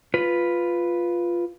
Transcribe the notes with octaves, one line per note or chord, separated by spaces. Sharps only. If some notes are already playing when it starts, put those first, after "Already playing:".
F4 B4